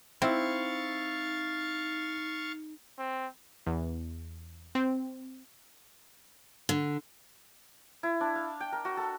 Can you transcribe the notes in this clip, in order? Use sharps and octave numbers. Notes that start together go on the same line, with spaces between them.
C4 D#4 E4 F5 C#6 A6
C4
E2
C4
D3
E4
D4
F5
G5
A#4
F#4
A4